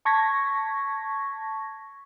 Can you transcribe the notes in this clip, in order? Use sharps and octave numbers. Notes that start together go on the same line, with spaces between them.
A5 C#6 G#6 A#6 B6